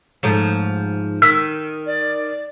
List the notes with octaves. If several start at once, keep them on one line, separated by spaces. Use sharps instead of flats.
G#2 F3 A3
D#3 E6 B6
D5